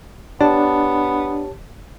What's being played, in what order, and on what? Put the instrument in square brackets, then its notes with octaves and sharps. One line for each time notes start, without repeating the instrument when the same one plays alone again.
[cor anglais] B3 [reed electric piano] D4 [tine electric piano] G4 C#5 A5